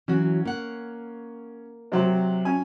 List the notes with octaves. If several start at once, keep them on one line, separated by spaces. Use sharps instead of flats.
E3 F#3 C#4 F#4
A#3 F#5
C3 F#3 C4
C#4 G#5